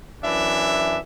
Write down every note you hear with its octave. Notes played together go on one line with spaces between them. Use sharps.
F#2 E3 D4 E5